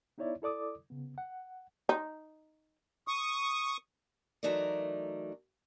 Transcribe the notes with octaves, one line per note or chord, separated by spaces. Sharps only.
B3 D#4 E4 C#5 D5 E5
E4 A4 D5 D6 D#6
C#3 B3
F#5
D#4
C#6 D#6
E3 F#3 A3 D#4 A#4 D5